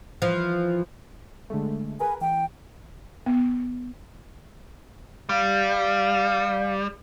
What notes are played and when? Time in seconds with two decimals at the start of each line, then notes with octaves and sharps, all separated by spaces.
0.22 E3 F3
1.50 D3 G#3 A3
2.00 G#4 A#4 B4 G#5
2.21 E3 G5
3.26 B3
5.29 G3 F5